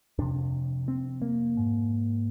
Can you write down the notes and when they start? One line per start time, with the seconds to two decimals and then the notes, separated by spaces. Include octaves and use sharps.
0.18 F2 C3 D4
0.88 C4
1.22 A#3
1.57 G#2